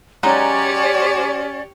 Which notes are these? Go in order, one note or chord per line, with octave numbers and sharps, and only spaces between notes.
F#3 G#3 C#4 D#4 G4 C#5 D5